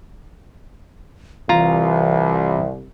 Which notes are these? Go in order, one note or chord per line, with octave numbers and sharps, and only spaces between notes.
C2 E3 F4 A#5